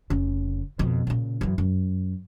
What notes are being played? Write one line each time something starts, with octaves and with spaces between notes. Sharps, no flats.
F1 C#3
F2 B2
A#2 C#3
F#2 E3
F#2